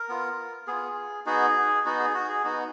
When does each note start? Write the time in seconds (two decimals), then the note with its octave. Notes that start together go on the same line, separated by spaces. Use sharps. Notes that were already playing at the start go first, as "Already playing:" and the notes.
Already playing: A#4
0.09 B3 F4
0.67 B3 F4 G#4
1.26 B3 D#4 F#4 G#4
1.85 B3 D#4 F#4
2.00 G#4
2.14 F#4
2.29 G#4
2.44 B3 D#4 F#4